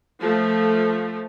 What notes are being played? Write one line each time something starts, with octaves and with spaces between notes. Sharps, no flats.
F3 A3